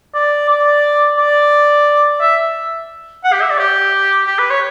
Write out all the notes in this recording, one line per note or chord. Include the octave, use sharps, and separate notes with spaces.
D5
D5
D5
E5
F#5
G4
E5
D5
G4
G4
B4
C#5